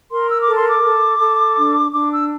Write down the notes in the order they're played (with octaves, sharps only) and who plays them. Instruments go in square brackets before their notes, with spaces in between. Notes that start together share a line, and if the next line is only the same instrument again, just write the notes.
[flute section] A#4 C6
E6
A4 D6
C6
D6
A4
A4
D4
D4 D6
E6